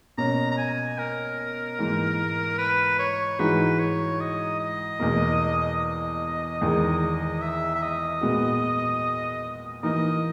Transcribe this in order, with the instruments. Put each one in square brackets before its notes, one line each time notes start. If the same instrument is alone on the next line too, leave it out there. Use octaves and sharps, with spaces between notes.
[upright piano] B2 A#3 C#4 [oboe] A#5
[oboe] A#5
G#5
A#4
[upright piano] G#2 E3 A#3
[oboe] B4
C#5
[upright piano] G#2 E3 G#3 D#4 F#4 [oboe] B4
[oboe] C#5
D#5
D#5
[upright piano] E2 B2 A#3
[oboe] D#5
[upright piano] E2 D#3 G#3
[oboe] E5
E5
D#5
[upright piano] A#2 G#3 B3 F#4
[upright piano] E3 A#3 D#4 [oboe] D#5